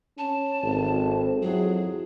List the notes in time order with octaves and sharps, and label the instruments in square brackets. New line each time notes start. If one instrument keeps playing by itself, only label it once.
[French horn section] C#4 [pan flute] A5
[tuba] G#1 [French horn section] C4 A4
[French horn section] F2 E4 [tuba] F#3 [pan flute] G#4